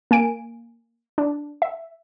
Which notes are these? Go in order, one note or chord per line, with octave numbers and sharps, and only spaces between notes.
A#3 G#5 D7
D4
E5